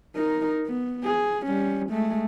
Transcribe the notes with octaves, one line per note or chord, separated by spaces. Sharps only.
D#4 A#4
B3
G#4
G3 C#4
G#3 A3